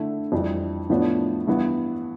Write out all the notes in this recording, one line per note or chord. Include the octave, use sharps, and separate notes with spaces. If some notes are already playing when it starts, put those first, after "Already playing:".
Already playing: D3 A3 E4
F2 E3 G3 D4
A2 F3 B3 D4
G2 E3 B3